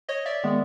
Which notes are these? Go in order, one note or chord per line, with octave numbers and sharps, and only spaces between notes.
C#5 D#5
D5 E5
D#3 G#3 B3